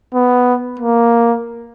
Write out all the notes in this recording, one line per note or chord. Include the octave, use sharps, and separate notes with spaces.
B3
A#3